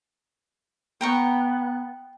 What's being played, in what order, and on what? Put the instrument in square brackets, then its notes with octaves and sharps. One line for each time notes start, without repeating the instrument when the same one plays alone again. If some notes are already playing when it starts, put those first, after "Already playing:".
[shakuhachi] B3 [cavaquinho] G5 A#5 C#6